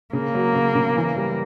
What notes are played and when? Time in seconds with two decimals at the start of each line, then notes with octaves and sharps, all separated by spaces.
0.13 C#3 A#3
0.35 F#3
0.55 C#3
0.75 C#3
0.97 E3
1.16 G3